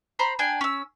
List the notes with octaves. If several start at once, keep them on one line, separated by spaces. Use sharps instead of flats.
C5 A#5 B5
D4 G5 G#5
C#4 E6